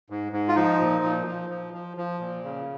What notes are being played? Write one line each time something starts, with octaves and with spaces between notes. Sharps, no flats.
G#2
G#2
F4
F3 D#4
A#2
F3
F3
F3
F3
F3
A#2
C#3